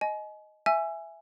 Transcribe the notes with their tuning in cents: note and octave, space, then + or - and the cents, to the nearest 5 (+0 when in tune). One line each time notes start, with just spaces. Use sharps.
D#5 +0 G#5 +35
E5 +5 G#5 +0 E6 +30